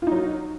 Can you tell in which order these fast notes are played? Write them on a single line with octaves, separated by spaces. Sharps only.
F4 D#4 F#3